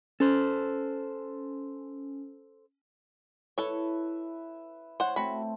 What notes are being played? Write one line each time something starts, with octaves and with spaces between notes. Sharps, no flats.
C#4 A4 C5
E4 A4 B4 C#5 E5
C5 C#5 F#5
A3 C4 F#4 B5